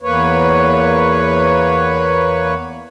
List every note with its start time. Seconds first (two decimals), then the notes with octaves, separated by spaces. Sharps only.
0.02 E2 A#3 B4 C#5